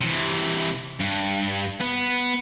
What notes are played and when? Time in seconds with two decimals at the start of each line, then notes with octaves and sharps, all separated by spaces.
0.01 C3 E3
1.00 G2
1.81 B3